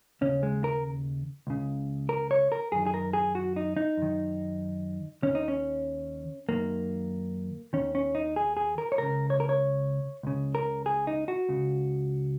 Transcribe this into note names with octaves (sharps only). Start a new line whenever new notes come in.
D#2 C#3 C#4
G#3
A#4
C#2 C#3
A#4
C#5
A#4
F#2 D#3 G#4
G#4
A#4
G#4
F#4
D#4
D#4
F#2 D#3
D#2 D#3 C#4
D#4
C#4
F#2 D#3 A#3
D#2 D#3 C#4
C#4
D#4
G#4
G#4
A#4
C#5
C#2 C#3 A#4
C#5
A#4
C#5
C#2 C#3
A#4
G#4
D#4
F#4
C#2 C#3